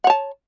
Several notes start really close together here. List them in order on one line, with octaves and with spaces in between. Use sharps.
F#5 C#5 A5